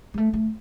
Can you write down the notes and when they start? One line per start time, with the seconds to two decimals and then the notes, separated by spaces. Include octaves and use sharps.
0.14 G#3
0.18 A3
0.33 A3